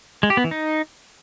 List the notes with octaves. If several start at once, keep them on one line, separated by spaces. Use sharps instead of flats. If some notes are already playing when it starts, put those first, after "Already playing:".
G#3
G4
B3
E3
D#4